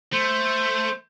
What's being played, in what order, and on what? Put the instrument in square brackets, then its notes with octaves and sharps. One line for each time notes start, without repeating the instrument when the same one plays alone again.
[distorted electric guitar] A3 [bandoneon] C5